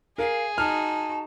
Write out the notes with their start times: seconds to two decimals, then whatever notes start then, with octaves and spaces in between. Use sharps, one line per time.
0.18 G#4 A#4 F5
0.58 D#4 F#4 A5 F6